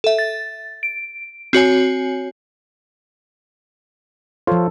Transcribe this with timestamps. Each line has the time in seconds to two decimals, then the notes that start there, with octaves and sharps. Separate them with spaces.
0.04 A4 E5
0.19 A6
0.83 D7
1.53 C4 F#4 C#5 G#5
4.47 F3 F4 A4 C5 C#5